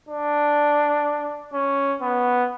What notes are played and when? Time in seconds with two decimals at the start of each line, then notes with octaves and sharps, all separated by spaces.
0.09 D4
1.53 C#4
2.02 B3